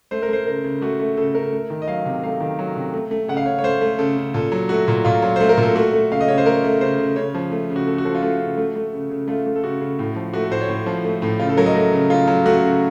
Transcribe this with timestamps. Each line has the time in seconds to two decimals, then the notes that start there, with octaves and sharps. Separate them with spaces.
0.11 A3 C5
0.22 A#4
0.29 A3 C5
0.46 C#3 A#4
0.64 C#3
0.82 A3 F#4
1.00 A3
1.17 C#3 A4
1.35 C#3 A#4
1.53 A3
1.70 D#3
1.82 D#5
1.88 F#3 F5
2.05 C3
2.23 A3 F5
2.40 D#3
2.59 F#3
2.76 C3
2.94 A3
3.11 A3
3.28 C#3 F#5
3.37 F5
3.46 C#3 C#5
3.59 C#5
3.64 A3 C5
3.81 A3
3.99 C#3 A4
4.16 C#3
4.34 A#2 A4
4.52 F#3
4.69 A3 F#4
4.88 A#2
5.05 A#2 F4
5.22 F#3
5.36 A3 C5
5.49 A#4
5.57 A#2 A4
5.75 A3 F#4
5.93 A3
6.11 C#3 F5
6.21 D#5
6.28 C#3 C#5
6.38 C5
6.46 A3 A#4
6.64 A3
6.81 C#3 C5
6.99 C#3
7.16 C#3 C#5
7.34 F3
7.52 A3
7.70 C#3
7.76 F#4
7.87 C#3 A4
7.98 F#4
8.05 F3 A4
8.15 F4
8.22 A3 F#4
8.40 C#3
8.58 A3
8.76 A3
8.93 C#3
9.10 C#3
9.28 A3 F4
9.46 A3
9.56 A4
9.63 C#3 F#4
9.81 C#3
9.99 A2
10.16 F3
10.33 A3 F#4
10.43 A4
10.51 A2 C5
10.61 C#5
10.69 A2
10.86 F3
11.04 A3
11.22 A2
11.40 C#3 F4
11.49 A4
11.57 F#3 A#4
11.66 D#5
11.75 A3
11.93 C#3
12.10 C#3 F4
12.27 F#3
12.46 A3 F#4
12.63 C#3